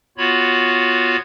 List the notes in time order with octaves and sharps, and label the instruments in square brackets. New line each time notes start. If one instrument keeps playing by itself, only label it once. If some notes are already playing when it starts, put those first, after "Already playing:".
[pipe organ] B3 F4 F#4 C#5 B5